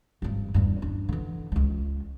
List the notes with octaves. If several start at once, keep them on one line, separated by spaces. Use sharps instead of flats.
G#1 G2
E2 G2
D4
D3 E3
C#2 G#3